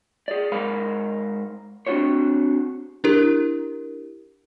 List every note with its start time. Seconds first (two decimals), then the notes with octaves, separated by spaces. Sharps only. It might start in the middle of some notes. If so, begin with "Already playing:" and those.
0.28 G#4 D5
0.52 G#2 A#4 C5 F5 B5
1.87 C4 D4 F4 F#4 C5 C#5
3.04 D4 E4 G4 A#4